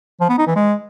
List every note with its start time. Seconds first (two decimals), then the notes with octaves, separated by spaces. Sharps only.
0.21 F3
0.29 B3
0.38 D#4
0.47 E3
0.56 G#3